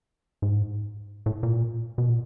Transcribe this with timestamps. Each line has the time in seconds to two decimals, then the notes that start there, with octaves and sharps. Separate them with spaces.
0.42 G#2
1.26 A2
1.43 A#2
1.98 B2
2.10 A#2